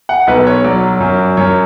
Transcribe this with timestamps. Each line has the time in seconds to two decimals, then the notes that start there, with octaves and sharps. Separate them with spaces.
0.09 F#5
0.27 B1 B4
0.47 C#5
0.64 F#3 D5
1.00 F#2
1.37 F#2 C#5